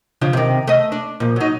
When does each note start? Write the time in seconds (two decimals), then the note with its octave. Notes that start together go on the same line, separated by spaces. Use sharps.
0.21 C#3 F3 D4
0.33 C3 D#3
0.67 A3 D#5
0.92 D4
1.20 A#2 F3
1.36 F#3 D#4